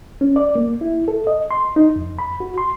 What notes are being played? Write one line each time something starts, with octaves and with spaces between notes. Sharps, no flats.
C#4
D5
A#3
E4
A4
D#5
C6
D#4
F2
B5
F#4
C6